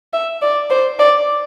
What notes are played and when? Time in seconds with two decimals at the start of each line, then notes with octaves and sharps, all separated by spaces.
0.13 E5
0.42 D5
0.70 C5
0.99 D5